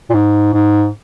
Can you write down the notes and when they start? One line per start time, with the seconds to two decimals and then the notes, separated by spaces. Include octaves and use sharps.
0.10 A#2
0.14 G#2
0.53 G#2